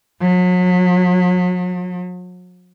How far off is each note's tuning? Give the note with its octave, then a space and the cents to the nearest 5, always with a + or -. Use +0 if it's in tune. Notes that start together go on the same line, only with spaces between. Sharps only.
F#3 -40